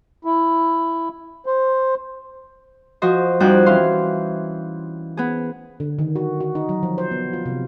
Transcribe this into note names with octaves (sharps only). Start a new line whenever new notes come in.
E4
C5
F3 F#4 D#5 C6
F2 G3 D#4 F#4 G5 F#6
E3 C#4 F5 C6
B3 G#4
D3
D#3
F#4
F#4
D#4
F#3
F3
C5
B3
F4
C3